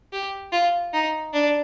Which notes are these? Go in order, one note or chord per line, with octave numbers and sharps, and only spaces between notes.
G4
F4
D#4
D4